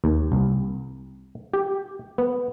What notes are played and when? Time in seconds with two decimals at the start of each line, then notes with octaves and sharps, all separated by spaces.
0.04 D#2
0.32 C2
1.54 G4
2.18 B3